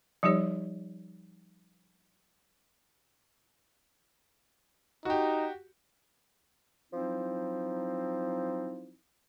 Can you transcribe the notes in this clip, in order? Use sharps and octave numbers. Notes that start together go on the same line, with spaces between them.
F3 G3 D#4 G4 C#5
D#4 F#4 G4
F3 F#3 C4 D#4 E4